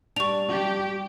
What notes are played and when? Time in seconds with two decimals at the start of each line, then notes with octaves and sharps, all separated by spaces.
0.16 G3 D4 C#6 F7
0.49 G4